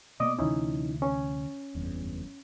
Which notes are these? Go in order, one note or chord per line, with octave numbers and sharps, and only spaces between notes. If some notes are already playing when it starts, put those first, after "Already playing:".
B2 A#3 B3 D5 D#5 D6
D2 C3 E3 C#4 D#4 E4
C#4
F#1 E2 G2